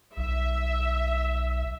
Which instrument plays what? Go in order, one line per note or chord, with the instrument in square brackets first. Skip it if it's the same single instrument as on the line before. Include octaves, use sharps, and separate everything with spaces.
[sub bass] B1 [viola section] E5